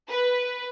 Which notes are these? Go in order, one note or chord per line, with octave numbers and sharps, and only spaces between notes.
B4